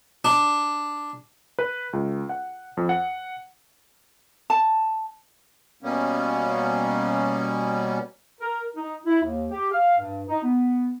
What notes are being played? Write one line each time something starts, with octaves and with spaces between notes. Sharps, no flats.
D4
B4
C#2
F#5
F2
F#5
A5
B2 G3 A#3 B3 C#4
A#4
D#4
E4
D#2
G4
F5
G2
D#4
B3